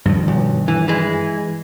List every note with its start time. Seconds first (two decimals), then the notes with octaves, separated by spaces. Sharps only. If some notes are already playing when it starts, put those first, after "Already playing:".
0.05 G2 D#3 F3
0.28 B1
0.68 E3
0.88 E3 G#3